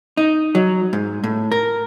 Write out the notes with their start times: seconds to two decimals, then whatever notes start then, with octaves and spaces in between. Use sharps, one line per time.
0.17 D#4
0.55 F#3
0.93 G#2
1.24 A2
1.52 A#4